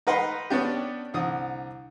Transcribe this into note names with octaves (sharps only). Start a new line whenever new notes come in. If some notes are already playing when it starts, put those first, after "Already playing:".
D#4 A#4 B4 F#5 B5 C6
B3 C#4 D4 G4
C2 D3 D#6